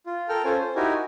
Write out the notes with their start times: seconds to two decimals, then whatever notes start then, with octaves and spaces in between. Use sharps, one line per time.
0.07 F4
0.29 A4 A#4 G5 F6
0.45 C#4 F4 A4 C5 G#5
0.61 C5
0.76 D#4 E4 F#4 G4 A#4 G#5
0.94 F#4